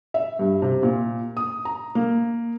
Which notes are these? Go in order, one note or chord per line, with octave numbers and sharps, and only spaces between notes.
E5
G2
C3
A#2
D#6
A#5
A#3